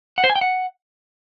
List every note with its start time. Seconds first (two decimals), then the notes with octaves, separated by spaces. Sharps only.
0.18 F#5
0.24 C5
0.30 G#5
0.36 G5
0.41 F#5